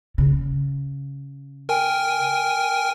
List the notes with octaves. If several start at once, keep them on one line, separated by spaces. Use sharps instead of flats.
C#3
A#4 G5 G#5